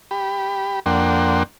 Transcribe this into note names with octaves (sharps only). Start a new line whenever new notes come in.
G4 B5
F2 A#3 D4 F#5 G5 C6